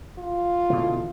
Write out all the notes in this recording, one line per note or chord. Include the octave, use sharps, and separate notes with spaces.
F4
B2 D3 E3